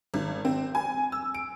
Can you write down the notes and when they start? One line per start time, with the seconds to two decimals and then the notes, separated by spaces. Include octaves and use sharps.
0.14 G#1
0.45 C4
0.75 G#5
1.12 E6
1.34 D7